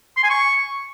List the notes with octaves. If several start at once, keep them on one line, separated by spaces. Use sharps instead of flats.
C6
G#5
C#6